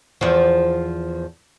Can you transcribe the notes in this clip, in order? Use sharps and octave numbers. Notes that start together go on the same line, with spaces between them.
E2 F3